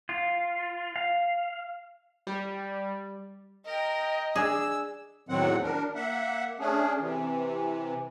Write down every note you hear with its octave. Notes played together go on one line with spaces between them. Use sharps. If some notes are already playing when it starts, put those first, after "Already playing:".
F4
F5
G3
A#4 D#5 G5
D4 G#4 G#5 E6
E2 A2 D#3 F#3 C4 F#5
D4 A#4
A#3 E5 F#5
A3 C#4 D4 G#4
C3 E3